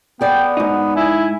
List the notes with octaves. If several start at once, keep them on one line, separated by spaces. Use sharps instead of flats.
B3 G#4 D5 G5
G#2 D#4 F#4
E4 G#5